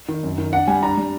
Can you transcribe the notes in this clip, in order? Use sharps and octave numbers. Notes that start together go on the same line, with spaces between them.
D#3
F#2
D#3
D4 F#5
G3 G#5
D4 A#5
G3